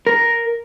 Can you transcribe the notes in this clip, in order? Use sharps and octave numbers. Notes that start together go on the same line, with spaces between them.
A#4